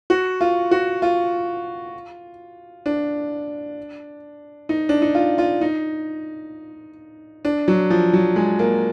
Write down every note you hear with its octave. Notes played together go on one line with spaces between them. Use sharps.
F#4
F4
F#4
F4
D4
D#4
D4
D#4
F4
F4
D#4
D4
F#3
F3
F#3
G#3
A#3